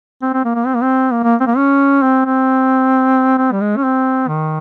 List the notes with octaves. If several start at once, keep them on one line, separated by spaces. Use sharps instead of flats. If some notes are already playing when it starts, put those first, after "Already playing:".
C4
C4
A#3
A#3
C4
A#3
C4
A#3
A#3
C4
A#3
C#4
C4
C4
C4
G3
G#3
C#4
C4
D#3